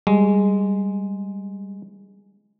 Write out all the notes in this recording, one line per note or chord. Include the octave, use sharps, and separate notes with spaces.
G3 G#3